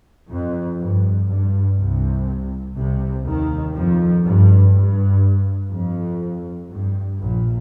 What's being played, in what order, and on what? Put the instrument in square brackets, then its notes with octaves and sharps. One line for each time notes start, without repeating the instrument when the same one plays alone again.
[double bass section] F2
G2
G2
C2 C3
C2 C3
D#2 D#3
F2 F3
G2
G2
F2
G2
A#1 A#2